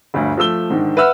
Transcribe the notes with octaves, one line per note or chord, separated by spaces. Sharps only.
G1 D2
F3 A3 E6 G7
G#2 D3 D#3
B4 E5 F#5 E6 F6